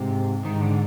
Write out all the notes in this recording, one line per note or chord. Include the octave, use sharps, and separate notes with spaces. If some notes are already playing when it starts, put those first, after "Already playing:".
Already playing: G#2 C3
G#2 D#3
D3